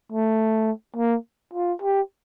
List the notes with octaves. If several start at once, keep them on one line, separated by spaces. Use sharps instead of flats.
A3
A#3
F4
G4